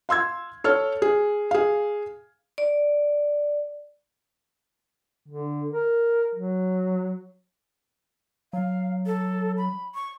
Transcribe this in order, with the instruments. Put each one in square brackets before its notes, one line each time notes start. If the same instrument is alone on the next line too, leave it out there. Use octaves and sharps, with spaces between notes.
[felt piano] F5 C6 E6 G#6
A4 C#5 F6
G#4
G#4 F5
[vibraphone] D5
[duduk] D3
A#4
F#3
[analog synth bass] F#3 [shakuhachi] F5
[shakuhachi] A4
B5
C#6